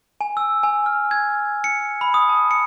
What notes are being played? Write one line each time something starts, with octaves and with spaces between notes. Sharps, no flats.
G#5
E6
G#5
F6
G#6
C#7
B5
D#6
A5
C#7